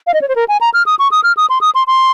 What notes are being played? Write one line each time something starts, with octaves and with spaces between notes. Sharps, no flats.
F5
D#5
C#5
C5
A#4
G#5
A#5
F6
D#6
C#6
D#6
F6
D#6
C6
D#6
C6
C6